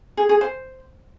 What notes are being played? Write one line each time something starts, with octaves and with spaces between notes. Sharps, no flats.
G#4
G#4
C5